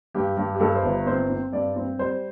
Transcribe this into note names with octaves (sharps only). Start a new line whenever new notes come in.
G2 G4
G2
G4
G2 A4
C5
G1
C4 C5
C4
G2 D5
C4
G3 C5